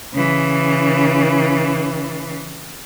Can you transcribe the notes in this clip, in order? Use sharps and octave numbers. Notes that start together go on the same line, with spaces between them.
C#3 E3